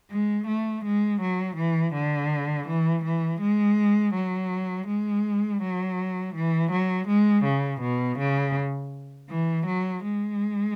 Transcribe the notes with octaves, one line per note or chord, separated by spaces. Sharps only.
G#3
A3
G#3
F#3
E3
D3
E3
E3
G#3
F#3
G#3
F#3
E3
F#3
G#3
C#3
B2
C#3
E3
F#3
G#3